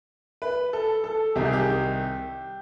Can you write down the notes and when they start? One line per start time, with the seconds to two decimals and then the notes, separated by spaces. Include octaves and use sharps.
0.42 B4
0.73 A4
1.04 A4
1.36 C2 C3 D#3 G4
1.45 G#4
1.53 G4